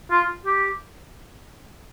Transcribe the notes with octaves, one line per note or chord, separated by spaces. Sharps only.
F4
G4